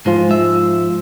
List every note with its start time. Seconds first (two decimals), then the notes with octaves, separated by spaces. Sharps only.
0.06 G#2 F3 G#3 F4
0.31 E5